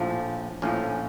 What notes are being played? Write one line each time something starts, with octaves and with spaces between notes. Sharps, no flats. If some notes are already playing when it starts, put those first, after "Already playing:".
Already playing: A#1 A2 F3
A#1 A2 F3 C#4